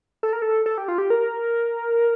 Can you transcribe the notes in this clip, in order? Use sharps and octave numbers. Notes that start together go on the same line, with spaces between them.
A4
A#4
A4
A4
G4
F4
G4
A#4